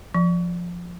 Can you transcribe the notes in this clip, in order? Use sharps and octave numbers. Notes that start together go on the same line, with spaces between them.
F3